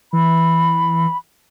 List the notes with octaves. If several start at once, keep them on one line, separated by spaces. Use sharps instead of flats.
E3 B5